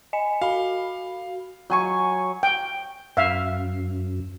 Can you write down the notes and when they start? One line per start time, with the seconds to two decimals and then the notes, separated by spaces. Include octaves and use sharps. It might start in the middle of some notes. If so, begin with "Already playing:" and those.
0.13 D#5 G#5 C#7
0.42 F#4 F5 B5
1.70 F#3 G#5 C#6
2.43 G5
3.17 F#2 E5 F5